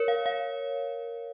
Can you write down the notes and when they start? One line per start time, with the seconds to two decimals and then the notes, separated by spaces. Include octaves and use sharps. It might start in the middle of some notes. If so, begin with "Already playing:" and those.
Already playing: A#4 C#5
0.08 F5
0.26 F5